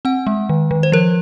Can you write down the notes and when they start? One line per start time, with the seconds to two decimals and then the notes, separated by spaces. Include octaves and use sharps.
0.05 C4 F#5
0.27 G#3
0.49 D#3
0.71 D#3
0.83 C5
0.92 F3 A#4